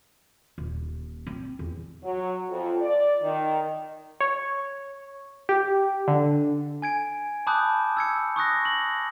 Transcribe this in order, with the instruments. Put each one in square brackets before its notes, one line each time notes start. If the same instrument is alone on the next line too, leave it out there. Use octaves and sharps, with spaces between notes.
[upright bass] D#1
C4
E2
[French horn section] F#3
F2
D5
D#3
[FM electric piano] C#5
G4
D3
[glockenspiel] G#5 G#6 D7
A5 B5 D6 D#6 F#6 G6
E6 G#6 C#7
C#6 D#6 F#6 A#6
F#7